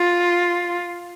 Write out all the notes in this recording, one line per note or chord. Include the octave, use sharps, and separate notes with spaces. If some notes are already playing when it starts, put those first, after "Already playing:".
Already playing: F4